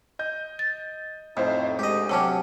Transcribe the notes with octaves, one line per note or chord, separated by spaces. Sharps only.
D#5 G6
A6
A1 F2 A2 D#4 C5
D2 G#3 G4 D#5
C3 F#3 C#4 G5 A5 D6